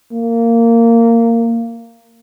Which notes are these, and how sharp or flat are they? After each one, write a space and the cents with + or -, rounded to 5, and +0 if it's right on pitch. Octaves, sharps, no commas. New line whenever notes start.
A#3 -15